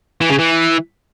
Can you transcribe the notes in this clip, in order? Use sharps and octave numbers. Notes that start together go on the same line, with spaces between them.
E3
C#3
E3